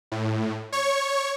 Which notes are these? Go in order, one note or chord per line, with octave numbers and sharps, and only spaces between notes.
A2
C#5 C#6